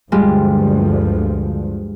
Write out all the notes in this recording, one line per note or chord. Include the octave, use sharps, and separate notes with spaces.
D2 G2 F3 G3 G#3 F4